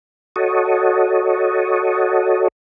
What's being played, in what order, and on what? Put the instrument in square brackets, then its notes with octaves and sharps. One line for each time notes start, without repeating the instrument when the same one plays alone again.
[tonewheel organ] F#4 A4 C#5 D#5